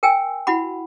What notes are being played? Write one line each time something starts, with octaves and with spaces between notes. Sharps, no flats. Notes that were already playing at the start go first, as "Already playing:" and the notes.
A#4 G5 G#5 E6
E4 F#4 F#5 B5